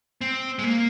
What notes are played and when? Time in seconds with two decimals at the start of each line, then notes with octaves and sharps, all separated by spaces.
0.21 C4
0.59 G#3
0.64 A#3